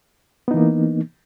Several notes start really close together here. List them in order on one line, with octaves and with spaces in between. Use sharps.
B3 D#4 E3 A#3